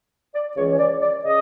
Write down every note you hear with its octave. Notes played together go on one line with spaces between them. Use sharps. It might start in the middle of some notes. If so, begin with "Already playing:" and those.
D5
C#2 C#3 E3 C#5
C#5
D5
D5
C#3 D#5